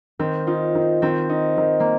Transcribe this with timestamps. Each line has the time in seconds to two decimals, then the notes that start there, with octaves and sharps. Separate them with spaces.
0.19 D#3 C4
0.47 D#4 F4
0.75 D#3
1.02 D#3 C4
1.30 D#4
1.58 D#3
1.80 A#3